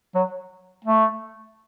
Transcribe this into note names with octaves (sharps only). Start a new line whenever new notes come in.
F#3
A3